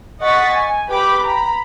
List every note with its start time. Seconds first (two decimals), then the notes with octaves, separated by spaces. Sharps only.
0.21 D#5 F#5 C#6 A6 B6
0.52 G#5
0.88 G4 B4 G5 B5 D6
1.25 A#5 B5